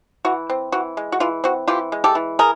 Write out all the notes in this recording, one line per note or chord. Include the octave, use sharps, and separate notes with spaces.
E3 F#4
C4
E3 F#4
G#3
F#4
E3 F4
C4 F#4
E3 F4 G4
G#3
G4 A4
E3
G#4 A#4